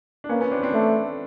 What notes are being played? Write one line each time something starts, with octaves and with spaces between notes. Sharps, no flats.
D4
A#3 B3 C#4
B3 C#4
C4 D4
C4 D4
A3